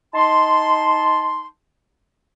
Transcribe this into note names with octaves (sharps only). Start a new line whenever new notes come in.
D#4 A5 C6